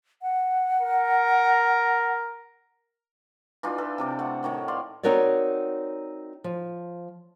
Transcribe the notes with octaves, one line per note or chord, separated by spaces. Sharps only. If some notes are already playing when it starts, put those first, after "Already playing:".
F#5
A#4
E3 D4 D#4 F4
A4 B4
C3 A4 D6
A3 F#5
A2 D#3 C#5 A5
D5 F5 C6
C4 D#4 F#4 A#4 C#5 D5
F3